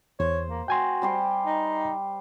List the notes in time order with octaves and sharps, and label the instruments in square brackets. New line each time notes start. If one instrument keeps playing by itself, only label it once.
[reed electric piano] E2 [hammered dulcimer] C5 [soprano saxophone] C#5
[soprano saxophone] A#3
[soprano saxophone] F#4 [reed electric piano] G5 G#5 C6
[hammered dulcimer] G3 G4 C5
[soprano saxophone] D#4